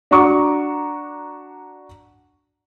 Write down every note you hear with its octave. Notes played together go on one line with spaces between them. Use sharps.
D4 F#4 A#5 C#6 D6